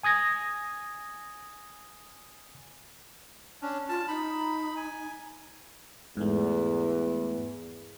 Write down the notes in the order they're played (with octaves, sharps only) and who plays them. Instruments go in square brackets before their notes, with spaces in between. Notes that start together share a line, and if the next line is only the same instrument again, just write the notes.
[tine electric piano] G#5 D#6 G#6 A#6
[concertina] C#4 D4
[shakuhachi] F4 [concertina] A5
[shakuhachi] D#4 [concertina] B5
[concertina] G#5
[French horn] E2 [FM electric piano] G#2 A3